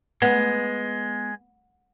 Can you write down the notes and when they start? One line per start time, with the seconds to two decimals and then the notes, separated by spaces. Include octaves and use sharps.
0.22 G#3 B3